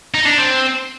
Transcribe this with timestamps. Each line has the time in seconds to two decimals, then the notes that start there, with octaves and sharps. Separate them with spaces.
0.14 D#4
0.26 D4
0.38 C4